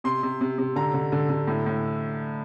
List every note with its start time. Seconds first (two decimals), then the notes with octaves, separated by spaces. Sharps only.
0.04 C3 C6
0.23 C3
0.41 C3
0.58 C3
0.76 D3 A#5
0.94 D3
1.12 D3
1.29 D3
1.47 A2
1.66 A2